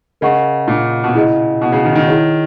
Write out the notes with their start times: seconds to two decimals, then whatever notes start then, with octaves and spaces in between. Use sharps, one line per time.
0.21 C#3 A#4 D#5 F#5 C#6
0.68 A#2
1.04 B2
1.14 C#3 E4 G#4 D#5
1.62 B2
1.72 C#3
1.85 D#3
1.95 D#3
2.08 E4 G#4 C#5